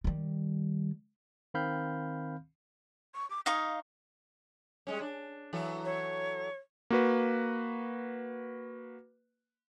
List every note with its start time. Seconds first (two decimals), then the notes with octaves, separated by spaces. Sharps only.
0.04 D#3 G3
1.54 D#3 C4 F5 B5 F6 G6
3.15 C#6
3.30 D6
3.46 D#4 F5 C#6 D#6
4.87 G3 G#3 C#4
5.01 D4
5.53 E3 F#3 A4
5.85 C#5
6.90 A#3 F#4 B4